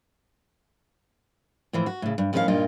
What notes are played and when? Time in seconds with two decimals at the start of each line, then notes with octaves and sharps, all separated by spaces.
1.73 A2 E3 F3
1.86 F#4
2.02 A2 C#3
2.18 G2
2.33 F2 A2 D#3 C#4 A4 F5
2.48 G2 A#2 D#4 F4